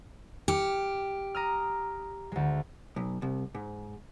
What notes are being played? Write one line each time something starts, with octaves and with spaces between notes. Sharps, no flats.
G4 D6 F6 C#7
A#5 D#6 F6
D2 G#3
B1
C2
G#2